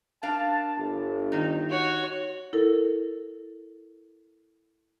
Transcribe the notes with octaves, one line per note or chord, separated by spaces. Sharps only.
D4 A#4 F5 A5
G1
D#3 D#4
F#4 C#5
E4 A4 A#4